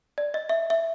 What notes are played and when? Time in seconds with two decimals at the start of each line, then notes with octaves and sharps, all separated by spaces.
0.18 D5
0.34 D#5
0.49 E5
0.70 E5